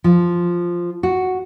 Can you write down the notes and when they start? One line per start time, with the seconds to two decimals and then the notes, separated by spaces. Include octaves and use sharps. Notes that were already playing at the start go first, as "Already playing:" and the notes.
0.04 F3
1.03 F#4